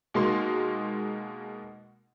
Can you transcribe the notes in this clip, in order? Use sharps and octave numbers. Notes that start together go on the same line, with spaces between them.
B2 G#3 A#3 D#4 C6